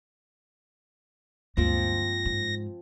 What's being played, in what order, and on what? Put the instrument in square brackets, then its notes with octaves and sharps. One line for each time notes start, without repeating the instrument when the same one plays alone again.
[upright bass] D2 [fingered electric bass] G2 G#3 A#3 [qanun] F3 C4 [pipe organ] A#6
[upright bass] G#2